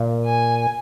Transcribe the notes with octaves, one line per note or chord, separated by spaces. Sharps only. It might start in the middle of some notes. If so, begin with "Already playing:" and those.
Already playing: A#2
G#5